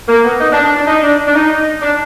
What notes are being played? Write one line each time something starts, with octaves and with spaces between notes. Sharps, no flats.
A#3
B3
D#4
D4
D4
D4
D#4
D4
D4
D#4
D4